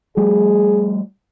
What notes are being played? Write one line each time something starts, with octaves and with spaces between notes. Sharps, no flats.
F3 G3 A3 G#4